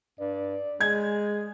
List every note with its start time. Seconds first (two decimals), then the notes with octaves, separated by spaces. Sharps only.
0.19 G2 D5
0.81 G#3 G#4 G#6